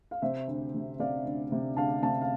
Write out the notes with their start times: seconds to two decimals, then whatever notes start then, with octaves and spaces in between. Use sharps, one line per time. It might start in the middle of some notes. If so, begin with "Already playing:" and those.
0.11 F5
0.22 C3 C5 E5
0.48 D2
0.74 C3
0.99 C3 D5 F5
1.26 D2
1.52 C3
1.76 D2 F5 A5
2.02 C3 F5 A5
2.21 F5